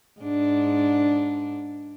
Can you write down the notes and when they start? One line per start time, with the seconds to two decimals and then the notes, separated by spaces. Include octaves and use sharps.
0.20 G#2 D4